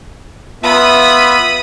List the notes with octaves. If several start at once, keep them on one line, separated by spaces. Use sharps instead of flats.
B3 F4 E5 B5 D#6